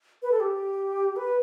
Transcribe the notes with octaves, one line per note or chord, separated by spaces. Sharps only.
B4
A4
G4
B4